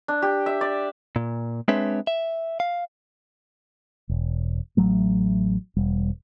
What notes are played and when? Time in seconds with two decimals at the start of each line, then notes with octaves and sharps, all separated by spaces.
0.08 D4
0.22 G4
0.46 E5
0.61 D5
1.16 A#2
1.68 G#3 C4 D4 B4 C#5 E5
2.07 E5
2.60 F5
4.09 E1
4.77 A1 F#3 A3
5.76 E1 G3